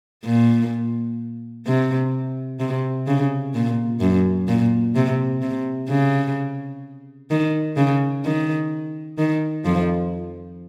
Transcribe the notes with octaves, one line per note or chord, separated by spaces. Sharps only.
A#2
C3
C3
C#3
A#2
F#2
A#2
C3
C3
C#3
D#3
C#3
D#3
D#3
F2 F3